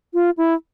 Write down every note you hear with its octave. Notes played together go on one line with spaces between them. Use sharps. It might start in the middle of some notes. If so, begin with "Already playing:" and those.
F4
E4